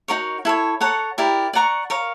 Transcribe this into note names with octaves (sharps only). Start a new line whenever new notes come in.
D#4 F#4 A#4 C#5
E4 A4 C#5
A4 C#5 F#5 A#5
E4 G4 A#4 D5
D5 F#5 A#5 C#6
A#4 C#5 F5